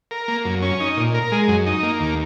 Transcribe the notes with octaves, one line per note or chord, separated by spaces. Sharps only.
A#4
A#3
F#2
C#4
D#4
A#2
A#4
G#3
F#2
D#4
A#3
D#2